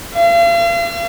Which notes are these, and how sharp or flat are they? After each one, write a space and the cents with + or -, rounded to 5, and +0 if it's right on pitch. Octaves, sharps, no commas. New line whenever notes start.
F5 -40